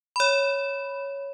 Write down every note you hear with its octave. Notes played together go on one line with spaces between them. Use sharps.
C#5 B5